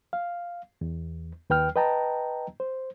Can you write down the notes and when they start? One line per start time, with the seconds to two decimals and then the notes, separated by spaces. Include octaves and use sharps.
0.13 F5
0.81 E2
1.50 D#2 B4 G5 F6
1.76 B4 D#5 G5 A5 A#5
2.60 C5